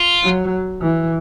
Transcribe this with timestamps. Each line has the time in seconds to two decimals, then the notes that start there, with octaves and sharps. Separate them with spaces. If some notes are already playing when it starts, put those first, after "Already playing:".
Already playing: F4
0.23 F#3
0.82 E3